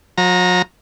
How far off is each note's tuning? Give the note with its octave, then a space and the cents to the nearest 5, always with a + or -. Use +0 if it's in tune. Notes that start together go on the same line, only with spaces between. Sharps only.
F#3 -45 A#5 +0